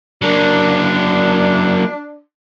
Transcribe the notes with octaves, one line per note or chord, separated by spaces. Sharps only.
F#3 A#3 D4